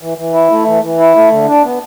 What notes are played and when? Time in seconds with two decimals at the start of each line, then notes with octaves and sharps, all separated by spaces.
0.02 E3
0.18 E3
0.34 E4
0.51 A3
0.67 E3
0.83 E3
0.99 E4
1.16 A3
1.32 D3
1.48 D4
1.64 B3